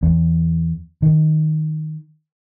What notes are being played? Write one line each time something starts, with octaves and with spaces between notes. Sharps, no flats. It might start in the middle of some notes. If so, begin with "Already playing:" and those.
E2
D#3